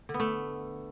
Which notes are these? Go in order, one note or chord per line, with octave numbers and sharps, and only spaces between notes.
D3
B3
A3